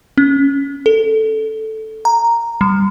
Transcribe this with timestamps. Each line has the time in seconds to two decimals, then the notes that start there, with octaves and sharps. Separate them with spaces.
0.17 C#4
0.86 A4
2.05 A#5
2.61 G3